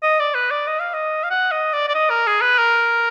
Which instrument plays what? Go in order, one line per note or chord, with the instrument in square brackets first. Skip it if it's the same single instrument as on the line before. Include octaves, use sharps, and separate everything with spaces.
[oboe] D#5
D5
B4
D5
D#5
F5
D#5
F5
F#5
D#5
D5
D5
D#5
A#4
G#4
B4
A#4